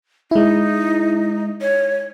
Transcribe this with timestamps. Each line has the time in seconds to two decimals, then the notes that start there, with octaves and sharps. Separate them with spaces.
0.31 G#3 D#4 E4
1.61 C#5